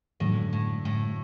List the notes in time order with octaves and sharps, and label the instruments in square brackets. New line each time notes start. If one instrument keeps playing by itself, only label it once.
[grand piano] F#2 D3 F#3 [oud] A2
[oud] A2
A2